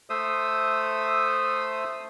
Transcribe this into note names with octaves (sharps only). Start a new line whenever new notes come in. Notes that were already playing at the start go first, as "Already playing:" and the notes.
A3 A4 C5 E5 D#6 E6